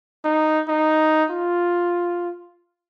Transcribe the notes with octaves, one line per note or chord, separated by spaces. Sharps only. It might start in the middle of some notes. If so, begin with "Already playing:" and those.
D#4
D#4
F4